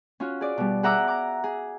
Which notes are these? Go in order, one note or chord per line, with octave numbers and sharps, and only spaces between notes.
C#4 F4 F#4
G#4 D5
B2 G3
G#4 E5 F#5 A#5 D6 E6
A#5 D6
G#4